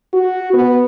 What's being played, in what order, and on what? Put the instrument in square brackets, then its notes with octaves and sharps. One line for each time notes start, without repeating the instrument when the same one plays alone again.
[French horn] F#4
B3